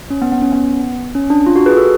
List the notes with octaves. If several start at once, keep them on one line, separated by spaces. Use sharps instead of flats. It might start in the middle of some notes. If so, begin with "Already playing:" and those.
C#4
B3
B3
C#4
B3
C#4
D4
F4
F#4
G#4 B4
F#4 A4